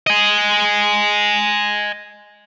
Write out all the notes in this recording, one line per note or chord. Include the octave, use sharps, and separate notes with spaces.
D#5 G#5